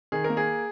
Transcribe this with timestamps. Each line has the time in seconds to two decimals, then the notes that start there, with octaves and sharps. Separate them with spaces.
0.12 D#3 G#4
0.24 A#4
0.29 A#3
0.37 G#4